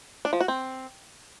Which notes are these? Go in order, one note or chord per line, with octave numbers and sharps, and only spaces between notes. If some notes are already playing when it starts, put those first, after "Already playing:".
D4
F3
F#4
C4